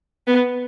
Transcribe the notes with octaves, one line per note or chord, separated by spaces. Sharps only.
B3